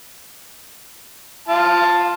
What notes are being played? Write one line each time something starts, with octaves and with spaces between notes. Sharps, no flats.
F4 A5